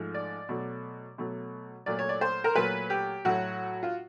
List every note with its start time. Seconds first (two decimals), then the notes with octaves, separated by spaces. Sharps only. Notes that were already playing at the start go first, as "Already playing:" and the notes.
Already playing: G#2 F3 A3
0.14 D5
0.49 B2 F#3 A3
1.18 B2 F#3 A3
1.86 A#2 F#3 A3 D5
1.99 C#5
2.09 D5
2.21 C5
2.44 A#4
2.55 A#2 F#3 A3 B4
2.90 G4
3.25 A2 F#3 A3 F#4
3.83 F4